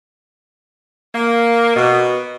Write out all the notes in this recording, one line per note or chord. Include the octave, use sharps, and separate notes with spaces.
A#3
B2